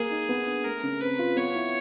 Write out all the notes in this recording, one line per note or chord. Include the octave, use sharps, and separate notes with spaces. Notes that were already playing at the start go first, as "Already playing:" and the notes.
Already playing: A#3 G#4
D#4
B3
D4
A3 A#4
C#3
C4 B4
F4
B3 C#5
E4